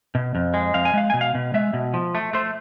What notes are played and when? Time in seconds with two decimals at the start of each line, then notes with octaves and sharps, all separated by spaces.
0.15 B2
0.35 F2
0.54 G#3
0.74 F2 F5
0.85 G#5
0.94 G#3 F5
1.10 B2 G#5
1.21 F5
1.35 B2
1.54 G#3 E5
1.73 B2
1.94 F3
2.15 A3
2.33 A3 C5